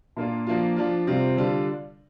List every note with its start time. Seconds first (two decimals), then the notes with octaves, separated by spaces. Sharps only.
0.16 A#2 A#3 D4 F4
0.47 F3 A#3 D4 F4
0.76 F3 D4 F4
1.07 C3 G3 C4 F4
1.37 D3 G3 D4 F4